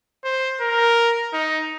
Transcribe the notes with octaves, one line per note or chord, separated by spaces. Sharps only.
C5
A#4
D#4